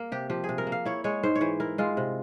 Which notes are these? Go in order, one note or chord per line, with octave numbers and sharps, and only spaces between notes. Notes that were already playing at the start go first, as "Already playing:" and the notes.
Already playing: A#3 A#4
C3 G4
F3 G4
G#4
C3
A#4
A#3
F5
E4 C#5
G#3 C#5
G#2 C5
C#5
E3 C5
E4 A#4
G#3 F4
C3